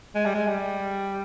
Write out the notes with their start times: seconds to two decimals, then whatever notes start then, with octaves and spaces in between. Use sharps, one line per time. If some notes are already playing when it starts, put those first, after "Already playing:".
0.15 G#3
0.26 G3
0.35 G#3
0.48 G3